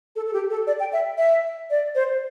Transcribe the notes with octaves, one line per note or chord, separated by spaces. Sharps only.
A4
A4
G4
A4
D5
G5
E5
E5
D5
C5